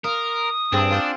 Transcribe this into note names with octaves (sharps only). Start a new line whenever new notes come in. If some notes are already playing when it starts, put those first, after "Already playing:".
A#4 F5 D#6
G2 C4 D4 G#4
F4 C5 F#5